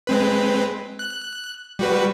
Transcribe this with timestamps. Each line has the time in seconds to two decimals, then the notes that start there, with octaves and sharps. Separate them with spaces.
0.07 G#3 C4 B4
0.99 F#6
1.79 G3 F#4 B4